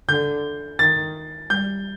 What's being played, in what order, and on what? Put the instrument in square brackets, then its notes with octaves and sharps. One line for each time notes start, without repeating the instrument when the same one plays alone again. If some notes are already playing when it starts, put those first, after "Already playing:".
[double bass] D3 [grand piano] G6
[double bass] D#3 [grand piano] A6
[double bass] G3 [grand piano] G6